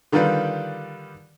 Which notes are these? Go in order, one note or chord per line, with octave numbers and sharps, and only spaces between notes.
D3 D#3 G3 F4 B4 D5